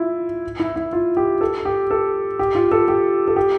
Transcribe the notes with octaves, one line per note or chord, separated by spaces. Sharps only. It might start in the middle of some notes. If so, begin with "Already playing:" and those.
Already playing: E4 F4
E4
E4
F4
G4
A4
G4
A4
G4
F4
A4
G4
A4
G4